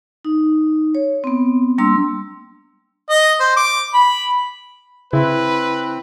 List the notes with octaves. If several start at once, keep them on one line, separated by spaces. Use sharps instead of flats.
D#4
C#5
B3 C4
G3 A#3 D4 C6 E6
D#5
C5
D6
B5
C#3 C4 E4 B4